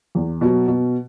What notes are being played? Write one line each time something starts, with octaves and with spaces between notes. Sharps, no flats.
E2
B2 F#3
B2